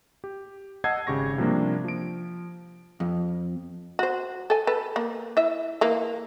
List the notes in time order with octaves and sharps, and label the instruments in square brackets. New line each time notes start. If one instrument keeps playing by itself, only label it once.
[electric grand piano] G4
D#5 F#5 A5 E6 G#6 C7
G#1 C#3 G4 C#6 A#6
C3 F3 G3 A#3 D4
F3 D7
[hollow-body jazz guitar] F2
[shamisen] F#4 C5
A4 G#5
A4 B4
A#3
E4 E5
E3 A#3 F4